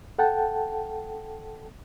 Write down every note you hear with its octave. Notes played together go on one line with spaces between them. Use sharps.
A4 F#5 G5 A5